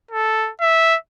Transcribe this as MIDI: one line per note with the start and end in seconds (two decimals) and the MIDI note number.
0.11 0.50 69
0.61 0.96 76